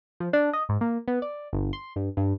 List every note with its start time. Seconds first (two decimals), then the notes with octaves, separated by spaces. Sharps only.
0.20 F3
0.33 D4
0.53 D#5
0.69 G#2
0.81 A#3
1.08 B3
1.22 D5
1.53 G1
1.73 C6
1.96 G2
2.17 G2